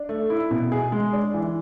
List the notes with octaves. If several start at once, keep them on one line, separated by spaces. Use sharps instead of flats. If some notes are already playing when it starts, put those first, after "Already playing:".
Already playing: D4
A3
E4
B2
G#4
G#3
D4
E3